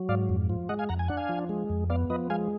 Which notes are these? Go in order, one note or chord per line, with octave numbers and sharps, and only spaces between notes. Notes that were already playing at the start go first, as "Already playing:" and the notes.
Already playing: F#3
G#2 D5 F5
F2
F3
G#3 D#5 F#5
F5 G#5
F2 F#5 A#5
G#5
D4 F#5
F5 G#5
F3
G#3
F2
B3 D5 F5
F3 B4 D#5
G#3 F5 G#5